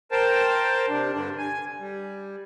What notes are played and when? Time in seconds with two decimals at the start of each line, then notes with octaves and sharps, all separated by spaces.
0.12 A#4 C5 G5 A5
0.89 C3 D4
1.13 G2 D3 D4
1.38 G#5
1.80 G3